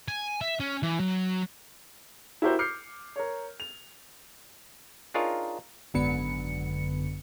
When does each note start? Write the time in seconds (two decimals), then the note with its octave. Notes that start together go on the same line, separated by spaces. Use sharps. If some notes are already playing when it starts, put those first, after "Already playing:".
0.08 G#5
0.41 E5
0.60 C#4
0.83 E3
1.00 F#3
2.42 E4 F#4 G4 A#4 C5
2.59 D6 F6 G6 C7 C#7
3.16 A#4 C#5
3.60 F7
5.14 D4 D#4 F4 G#4 A#4 C#5
5.94 G#1 F#2 D3 B3 C#7